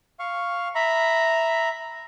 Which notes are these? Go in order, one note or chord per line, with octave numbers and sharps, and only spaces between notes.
F5 C#6
E5 A#5 B5